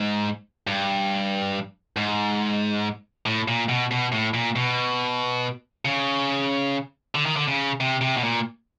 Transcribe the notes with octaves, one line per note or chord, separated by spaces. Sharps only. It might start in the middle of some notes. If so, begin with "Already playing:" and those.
Already playing: G#2
G2
G#2
A2
A#2
B2
B2
A2
A#2
B2
C#3
D3
D#3
D3
C#3
C3
C3
B2
A#2